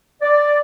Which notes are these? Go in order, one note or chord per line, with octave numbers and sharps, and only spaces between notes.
D5